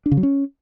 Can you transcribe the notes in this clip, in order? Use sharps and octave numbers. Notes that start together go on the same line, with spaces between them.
D4
C#3
F#3
C#4